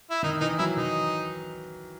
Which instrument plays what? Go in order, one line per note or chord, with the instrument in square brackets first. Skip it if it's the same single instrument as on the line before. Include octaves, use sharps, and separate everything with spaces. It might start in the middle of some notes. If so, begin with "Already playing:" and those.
[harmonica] E4
[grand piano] D#3 [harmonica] D#4
[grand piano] E3 [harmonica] D#4
[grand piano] F#3 [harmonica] E4
[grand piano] E3 [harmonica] D#4